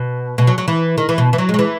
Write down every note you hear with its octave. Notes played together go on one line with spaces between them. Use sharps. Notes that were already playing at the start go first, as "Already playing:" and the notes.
Already playing: B2
B2
F#3
F#3
E3
D#3
E3
B2
E3
F#3
G#3
F#3
E3